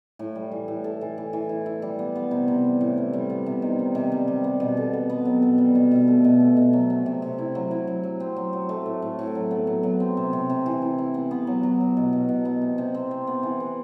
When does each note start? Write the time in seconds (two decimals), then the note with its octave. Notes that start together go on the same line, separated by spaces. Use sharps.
0.19 A2
0.35 G3
0.52 E3
0.68 A2
0.84 A4
1.01 E3
1.18 E3
1.33 E3
1.49 E4
1.66 E4
1.82 G3
1.99 B3
2.15 B3
2.31 C3
2.48 C3
2.64 G3
2.81 A2
2.97 G3
3.13 G3
3.30 B3
3.46 C3
3.62 D#3
3.79 D#3
3.95 C3
4.12 G3
4.28 G3
4.44 B3
4.60 B2
4.77 A4
4.93 B3
5.10 B3
5.25 F#3
5.42 B2
5.58 G3
5.75 B2
5.91 B2
6.08 A3
6.24 B2
6.41 A3
6.57 B2
6.73 F#3
6.90 C3
7.06 C3
7.22 C3
7.38 E4
7.55 F#3
7.71 E4
7.87 F#3
8.03 F#3
8.20 C4
8.36 F#3
8.53 F#3
8.69 A3
8.86 A2
9.02 A2
9.19 A2
9.35 F#3
9.51 B3
9.67 F#3
9.83 F#3
10.00 C4
10.17 C3
10.33 C3
10.50 C3
10.66 E3
10.82 E4
10.98 E4
11.14 B3
11.31 B3
11.47 F#3
11.63 F#3
11.81 F#3
11.97 B2
12.13 B2
12.29 B2
12.45 B3
12.61 C3
12.78 C3
12.94 C4
13.11 C4
13.27 B3
13.43 E3
13.60 B3